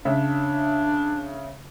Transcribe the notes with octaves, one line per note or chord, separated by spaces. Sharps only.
C#3 D4 E5